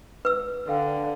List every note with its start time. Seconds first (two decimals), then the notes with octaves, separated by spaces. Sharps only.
0.25 B4 E6
0.68 D3 A4 F5 G5